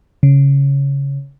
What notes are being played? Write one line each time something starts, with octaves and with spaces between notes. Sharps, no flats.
C#3